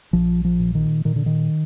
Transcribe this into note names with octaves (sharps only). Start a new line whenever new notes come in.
A#1 F3
F3
A#2
D#3
A#2 D#3
D3
D#3